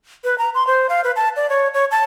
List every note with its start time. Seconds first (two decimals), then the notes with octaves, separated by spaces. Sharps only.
0.24 B4
0.38 A#5
0.55 C6
0.67 C5
0.89 F5
1.04 B4
1.16 A5
1.36 D5
1.49 C#5
1.74 C#5
1.91 A5